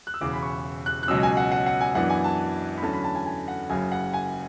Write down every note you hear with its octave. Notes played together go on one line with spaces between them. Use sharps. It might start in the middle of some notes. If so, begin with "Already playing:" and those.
F#6
E6
E1 E2 C#3 E3 D6
B5
C#6
F#6
F#6
C#2 B2 F#3 C#4 E6
G#5
F#5
F#5
F#5
G#5
F#2 E3 B3 D4 F#5
G#5
A5
B5
E2 D3 F#3 A3 C#4 A5
B5
A5
G#5
G#5
F#5
F#1 F#2 C#3 F#3 G#5
F#5
G#5